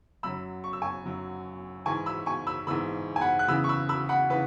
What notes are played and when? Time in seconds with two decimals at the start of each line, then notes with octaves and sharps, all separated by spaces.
0.23 F#2 F#3 B5 E6
0.64 C#6
0.73 E6
0.82 G#5 C#6
1.06 F#2 F#3
1.86 G#2 E3 G#5 C#6
2.06 B5 E6
2.26 G#5 C#6
2.47 B5 E6
2.67 G#2 E3 B5 E6
3.16 G#5
3.21 F#5 B5
3.39 F#6
3.48 E2 C#3 E3 B5 E6
3.64 C#6
3.69 B5 E6
3.89 B5 E6
4.09 F#5 B5
4.30 C#3 E3 B4